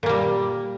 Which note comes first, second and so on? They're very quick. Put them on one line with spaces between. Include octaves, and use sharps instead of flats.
A#2 A#3 G3